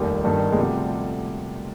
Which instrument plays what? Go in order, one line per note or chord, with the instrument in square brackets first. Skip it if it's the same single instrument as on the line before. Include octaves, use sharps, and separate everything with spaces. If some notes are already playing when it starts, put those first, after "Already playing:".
Already playing: [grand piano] F1 D#2 D#3 G3
G1 G2 D#3
G#3
D2 C3 F3 G3